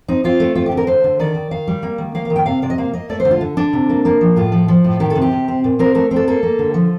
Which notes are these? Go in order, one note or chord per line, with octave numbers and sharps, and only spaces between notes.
C4 D#4
C4 F4
A3
C4 F4
G4
D3
A#4
D3 C5
D3
D#3 D5
D#3
D#3 F5
G3
A#3
D#3
A#3 F5
F5
D#3
G5
C3 F5
C3 D5
D#5
A#3 F5
A#3 D#5
A3 D5
C5
D3
F4
D3
D3 D4
C3
A#3
A#3
F3
A2 F4
F3
F3
A2
D#3 G4
A4
C3
G4
C3
C4
A#2
C4 A#4
A3 A#4
C4
A4
A#3 A4
A#3
D3
F3